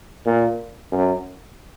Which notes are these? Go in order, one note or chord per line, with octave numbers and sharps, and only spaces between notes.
A#2
F#2